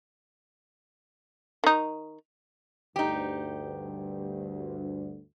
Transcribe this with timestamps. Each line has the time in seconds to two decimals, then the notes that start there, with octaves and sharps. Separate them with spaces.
1.64 D#3 D#4
2.96 D2 G2 D#4 G4